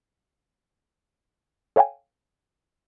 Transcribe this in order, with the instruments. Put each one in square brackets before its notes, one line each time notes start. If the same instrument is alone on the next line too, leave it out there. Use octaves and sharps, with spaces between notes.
[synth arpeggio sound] A4 C#5 F5 G5 G#5